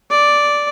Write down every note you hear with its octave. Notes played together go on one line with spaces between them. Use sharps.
D5